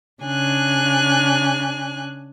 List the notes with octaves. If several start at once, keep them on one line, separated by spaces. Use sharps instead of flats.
C#3 D4 G#5 F#6